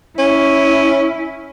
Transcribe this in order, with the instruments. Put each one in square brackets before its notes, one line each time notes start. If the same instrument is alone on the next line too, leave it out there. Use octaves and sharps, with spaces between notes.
[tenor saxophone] C#4 [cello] E4